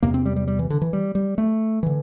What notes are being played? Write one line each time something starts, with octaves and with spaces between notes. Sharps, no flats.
E2 C3 A#3
C4
G3
G3
G3
E3
D3
E3
G3
G3
A3
D3 E3